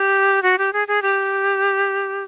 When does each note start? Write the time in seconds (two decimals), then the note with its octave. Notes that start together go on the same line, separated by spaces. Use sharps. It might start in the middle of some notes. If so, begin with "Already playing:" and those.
Already playing: G4
0.42 F#4
0.58 G4
0.73 G#4
0.88 G#4
1.02 G4